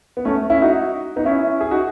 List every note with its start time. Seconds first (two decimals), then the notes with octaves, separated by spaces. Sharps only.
0.17 B3
0.25 A3 C#4
0.50 C#4 E4
0.62 D#4 F#4
1.16 B3 D#4
1.25 C#4 E4
1.61 G#4
1.71 D#4 F#4